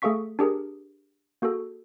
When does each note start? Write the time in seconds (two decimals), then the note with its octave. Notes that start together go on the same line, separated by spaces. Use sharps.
0.02 A3 G#4 A4 F5 C#6 B6
0.39 D4 G4 G#4 A#4
1.42 A#3 F#4 G#4 A4